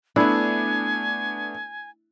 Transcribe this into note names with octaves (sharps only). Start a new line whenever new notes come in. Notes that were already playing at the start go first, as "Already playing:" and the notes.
A3 B3 D4 E4 G#5